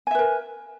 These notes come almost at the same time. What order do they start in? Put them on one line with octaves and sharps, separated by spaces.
G#5 E5 B4 A#4